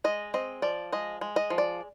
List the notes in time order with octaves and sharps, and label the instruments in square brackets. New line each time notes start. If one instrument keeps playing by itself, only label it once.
[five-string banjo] G#3 D#5
C4 D#5
F3 D5
G#3 D#5
G#3
D#5
F3
D5